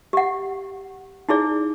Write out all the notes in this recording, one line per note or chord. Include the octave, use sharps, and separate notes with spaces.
G4 F#5
D#4 E4 G#4 D5